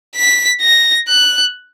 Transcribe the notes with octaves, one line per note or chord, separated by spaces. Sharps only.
B6
A#6
F#6